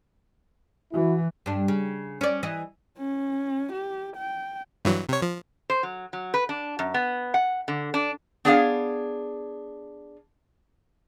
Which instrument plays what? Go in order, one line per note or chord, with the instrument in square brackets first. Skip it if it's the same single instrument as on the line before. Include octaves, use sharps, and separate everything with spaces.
[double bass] E3 [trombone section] E4 F#4
[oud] G2 D4
C#3
C#4 D5
E3 D#5
[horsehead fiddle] C#4
G4
G5
[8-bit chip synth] G2 E3 F#3
C3 C#5
F3
[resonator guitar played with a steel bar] C5
F#3
F#3
B4
D4
F#2
B3
F#5
D3
D4
B3 D4 G#4 C#5 E5 F5